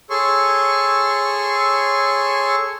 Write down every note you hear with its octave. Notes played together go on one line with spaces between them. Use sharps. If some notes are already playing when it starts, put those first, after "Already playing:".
G#4 A4 C#5 C6 C#6